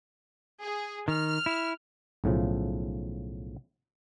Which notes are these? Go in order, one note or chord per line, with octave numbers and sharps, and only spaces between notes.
G#4
D#3 F6
E4
B1 A2 C#3 F3